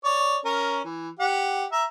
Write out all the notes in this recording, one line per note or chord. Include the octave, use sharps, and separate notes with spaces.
C#5 D5
C#4 A#4
E3
G4 F#5
E5 A#5